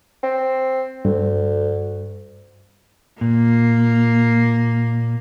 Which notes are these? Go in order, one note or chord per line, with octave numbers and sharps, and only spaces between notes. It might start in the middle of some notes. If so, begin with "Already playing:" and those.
C4
D2 G2
A#2 A#3